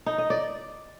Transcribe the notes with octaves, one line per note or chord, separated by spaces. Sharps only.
D#4
D#5
D5